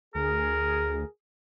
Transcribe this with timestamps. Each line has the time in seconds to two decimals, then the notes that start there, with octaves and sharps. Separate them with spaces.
0.15 D2 G#4 A#4